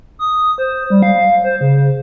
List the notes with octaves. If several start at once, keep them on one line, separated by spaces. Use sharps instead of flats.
D#6
C5
G3
F5
C5
C#3